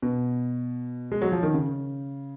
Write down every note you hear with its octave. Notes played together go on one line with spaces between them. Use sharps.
B2
G#3
F#3
F3
D#3
C#3